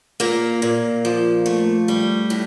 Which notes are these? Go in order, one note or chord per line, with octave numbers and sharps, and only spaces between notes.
A#2 A#3
A#2
F3
A3
G3
A2